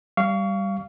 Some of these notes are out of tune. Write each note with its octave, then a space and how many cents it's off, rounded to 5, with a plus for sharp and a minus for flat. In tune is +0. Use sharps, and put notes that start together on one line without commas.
G3 +0 F5 -15 C#6 +30